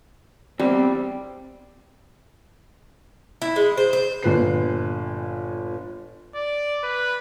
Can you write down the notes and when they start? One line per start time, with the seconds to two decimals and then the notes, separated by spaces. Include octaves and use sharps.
0.59 E2 C3 G3 C4
3.42 E4
3.56 G#3
3.77 C5
3.93 C5
4.23 G1 A#2 B4 C7
6.35 D5
6.83 B4